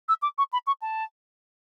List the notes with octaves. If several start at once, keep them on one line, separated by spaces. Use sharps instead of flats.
E6
D6
C#6
B5
C#6
A5